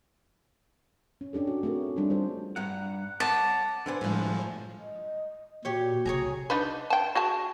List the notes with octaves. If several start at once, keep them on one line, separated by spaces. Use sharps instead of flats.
C#4
C#4 D4 G4 A4
F#4
A3 C4 F#4 G#4 A#4
G3 D4 D#4 F4
G3 A4 C5
G2 G3 F#5 A#5
C#5 F#5 A5 D6
D3 D4 B4 C5 G#5
A2 F3 G3 G#3
D#5
A#2 F#4 G4 C#5
C2 G#4 C#5 G#5 A#5
D4 D#4 B4
G5 A5
F#4 G#4 A5